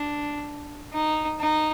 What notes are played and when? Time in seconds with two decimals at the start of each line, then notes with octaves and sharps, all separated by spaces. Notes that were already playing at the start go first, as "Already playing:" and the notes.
Already playing: D4
0.93 D#4
1.40 D#4